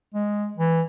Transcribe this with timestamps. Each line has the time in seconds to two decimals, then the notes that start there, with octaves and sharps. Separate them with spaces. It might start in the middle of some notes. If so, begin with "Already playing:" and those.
0.14 G#3
0.57 E3